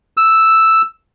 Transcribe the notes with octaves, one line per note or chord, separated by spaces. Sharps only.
E6